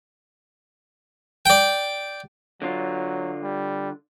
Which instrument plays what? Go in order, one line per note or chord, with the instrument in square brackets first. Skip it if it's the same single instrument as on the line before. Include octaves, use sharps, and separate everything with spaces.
[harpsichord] D5 G5
[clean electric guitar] D3 F4 [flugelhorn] F#3
[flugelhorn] G3